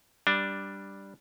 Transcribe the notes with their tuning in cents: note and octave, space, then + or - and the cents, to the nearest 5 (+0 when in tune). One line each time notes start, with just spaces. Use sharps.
G3 +0 D4 +0